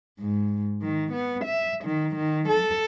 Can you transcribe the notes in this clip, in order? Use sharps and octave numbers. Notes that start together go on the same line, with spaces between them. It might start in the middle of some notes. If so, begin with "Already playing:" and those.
G#2
D#3
B3
E5
D#3
D#3
A4